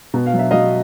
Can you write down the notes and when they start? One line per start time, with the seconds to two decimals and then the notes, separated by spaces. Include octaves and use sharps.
0.14 B2
0.26 F5
0.34 F#3
0.39 E5
0.51 F#3 D#5 F5